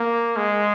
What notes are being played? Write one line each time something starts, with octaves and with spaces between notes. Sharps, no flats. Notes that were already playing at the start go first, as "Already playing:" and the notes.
Already playing: A#3
G#3